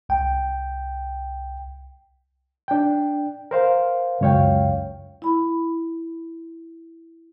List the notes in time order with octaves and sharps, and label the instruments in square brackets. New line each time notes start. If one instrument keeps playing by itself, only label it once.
[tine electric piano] C2 G5
[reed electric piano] D4 G5
A#4 C5 F5
C#2 F#2 C#5 F5 G5
[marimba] E4 B5